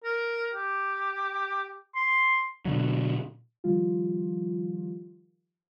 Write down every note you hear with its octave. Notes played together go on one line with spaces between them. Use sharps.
A#4
G4
C6
B2 D3 F#3
D#3 F3 G3 F4